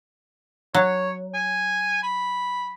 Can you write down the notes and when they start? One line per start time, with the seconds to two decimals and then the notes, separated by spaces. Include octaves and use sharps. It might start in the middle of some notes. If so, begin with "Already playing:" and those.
0.75 F#3 C#5
1.34 G#5
2.03 B5